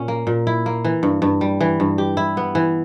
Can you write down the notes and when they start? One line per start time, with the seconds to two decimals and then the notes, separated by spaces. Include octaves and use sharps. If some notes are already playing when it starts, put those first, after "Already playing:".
Already playing: A#2 C#4
0.08 A#3
0.27 A#2
0.47 E4
0.66 A#3
0.85 E3
1.03 G2
1.22 G2
1.41 G3
1.61 E3
1.80 G2
1.98 G4
2.17 E4
2.37 B3
2.55 E3